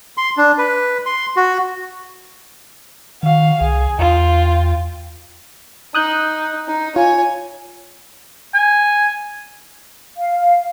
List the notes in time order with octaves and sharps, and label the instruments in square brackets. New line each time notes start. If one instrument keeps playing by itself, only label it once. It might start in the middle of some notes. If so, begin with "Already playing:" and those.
[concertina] C6
D4
B4
C6
F#4
[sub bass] D#3 [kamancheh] F#4 F5
[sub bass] C2 [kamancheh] G#4
[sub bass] E2 [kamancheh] F4 G5
[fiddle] D#4 [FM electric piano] D#6 F#6 G6
[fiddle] D#4
[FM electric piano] F4 [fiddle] C#5 G#5
[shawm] G#5
[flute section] F5